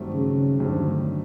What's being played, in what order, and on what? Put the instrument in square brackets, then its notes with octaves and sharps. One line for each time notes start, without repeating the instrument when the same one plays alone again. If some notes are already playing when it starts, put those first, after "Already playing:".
Already playing: [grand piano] G2 D#3 F#3 A3 C4
[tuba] C#3
[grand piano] G2 D#3 F#3 A3 C4 [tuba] D3